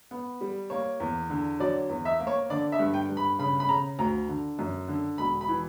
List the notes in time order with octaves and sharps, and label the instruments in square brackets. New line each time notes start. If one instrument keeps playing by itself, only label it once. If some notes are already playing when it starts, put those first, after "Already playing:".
[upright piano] B3
G3
A#3 C#5
E2
D3
F#3 D5
E2
E5
A#3
C#5
D3 D5
E5
G2
G5
G2
B5
C#3 B5
B5
C#3 A#5
D2 A#5
D3
F#2
D3
E1 B5
B5
E3